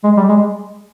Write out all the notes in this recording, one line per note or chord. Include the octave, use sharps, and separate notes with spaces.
G#3
G3
G#3